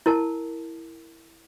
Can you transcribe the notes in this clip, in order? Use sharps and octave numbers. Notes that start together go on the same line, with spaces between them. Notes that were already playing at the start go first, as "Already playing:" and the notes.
E4 A#4 A5